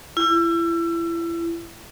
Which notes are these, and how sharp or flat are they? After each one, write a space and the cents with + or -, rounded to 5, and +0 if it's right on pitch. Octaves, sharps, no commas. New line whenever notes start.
E4 +30